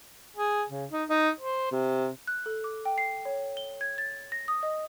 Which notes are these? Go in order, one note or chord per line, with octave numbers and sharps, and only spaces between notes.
G#4
C#3
D#4
D#4
C5
C3
F#6
A4
D6
G5
C7
C#5
G7
G#6
A6
A#6
D#6
D#5